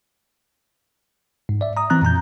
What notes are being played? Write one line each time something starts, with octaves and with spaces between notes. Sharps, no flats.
G#2
D5 E5
A#5 D#6
E3 C4 A#5 F#6
F2 A#2 A#5 G6